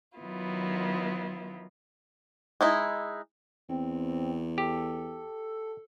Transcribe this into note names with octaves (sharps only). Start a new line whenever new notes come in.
D#3 F#3 B3 E4 F4
G#3 D#4 E4
E2 C4
G4 A4